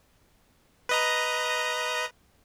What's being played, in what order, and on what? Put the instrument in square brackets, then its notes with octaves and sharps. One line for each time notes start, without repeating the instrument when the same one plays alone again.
[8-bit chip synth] B4 D#5 A#5